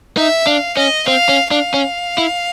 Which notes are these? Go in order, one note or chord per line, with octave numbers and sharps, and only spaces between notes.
D#4 E5
D4 F5
C#4 D#5
C4 F5
C#4
D4 F5
C#4
E4